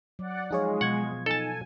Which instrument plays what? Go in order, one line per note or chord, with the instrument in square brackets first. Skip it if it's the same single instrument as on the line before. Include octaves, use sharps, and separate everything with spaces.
[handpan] F#3 [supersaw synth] D5 F#5
[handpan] F3 F5 [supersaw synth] G#3 [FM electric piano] D#4 G#4 C#5
[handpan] B2 [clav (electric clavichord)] F#5 [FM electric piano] C#6 G#6
[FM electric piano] D#4 [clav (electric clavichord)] A4 A5 [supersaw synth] G#5